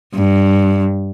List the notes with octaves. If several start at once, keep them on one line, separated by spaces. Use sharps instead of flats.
G2